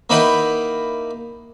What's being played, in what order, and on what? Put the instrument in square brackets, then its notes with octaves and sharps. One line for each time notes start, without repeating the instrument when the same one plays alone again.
[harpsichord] A#3 D#4 E4 B4 F#5 G5